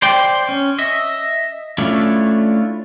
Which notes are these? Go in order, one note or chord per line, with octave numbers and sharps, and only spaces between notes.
C5 D5 G5
C#4
D#5 E5
A3 C#4 D4 E4 F4